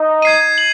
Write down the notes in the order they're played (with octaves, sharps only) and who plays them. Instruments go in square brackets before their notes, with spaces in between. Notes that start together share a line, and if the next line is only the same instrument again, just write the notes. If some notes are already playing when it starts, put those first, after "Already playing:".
Already playing: [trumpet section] D#4 D#5
[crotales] G#6 C7 D#7
F#7